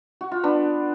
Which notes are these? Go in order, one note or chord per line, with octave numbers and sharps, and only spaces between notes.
F#4
F4
B3 D4